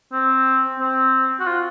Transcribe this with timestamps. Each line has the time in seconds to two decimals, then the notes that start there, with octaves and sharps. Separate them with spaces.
0.13 C4
0.80 C4
1.40 F#4
1.47 F4